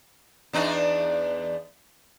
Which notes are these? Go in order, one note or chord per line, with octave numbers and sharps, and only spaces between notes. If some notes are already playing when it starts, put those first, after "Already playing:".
E2 D4 D#4